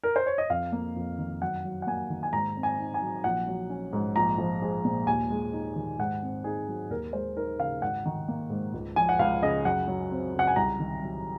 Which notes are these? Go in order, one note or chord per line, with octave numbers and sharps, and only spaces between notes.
A#4
C5
C#5
D#5
F2 F5
A#3
F2
D#3
F#2 F#5
F#3
F#5
A#3 G#5
D#3
G#5
G#2 A#5
C4
G#5
D#4
G#5
F#3
A#1 F#5
F#3
C#4
G#2
A#1 A#5
F3
G#3
A#2
D#2 G#5
G#3
D#4
D#3
G#2 F#5
C4
D#4 G#4
F#3
D#2 A#4
G#3 C5
D#4 A#4
C#3 F5
G#1 F#5
D#3
A#3
G#2
C#2
F3 G#5
F#5
C#2 F5
C#3 D#5
F#2 F#5
F#3
C4
C#3 F#5
G#5
C2 A#5
D#3
F#3